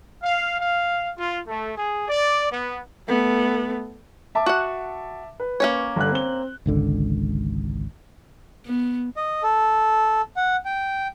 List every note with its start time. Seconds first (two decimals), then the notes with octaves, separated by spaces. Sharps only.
0.23 F5
0.59 F5
1.17 F4
1.47 A3
1.77 G#4
2.07 D5
2.51 B3
3.08 A3 B3
4.35 E5 A5 D6
4.46 F#4 F#5
5.40 B4
5.60 A#3 C#4 C#5
5.96 G1 D3 F#6
6.12 C4 G7
6.66 G#1 C#2 D3
8.66 B3
9.17 D#5
9.43 A4
10.37 F#5
10.65 G5